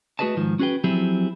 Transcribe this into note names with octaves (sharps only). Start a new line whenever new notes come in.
A3 F#4 G#4 B4 D#5 A5
G#2 D#3 F3
C#4 F#4 G#4 B4 G5
F3 F#3 C4 E4 G4 G#4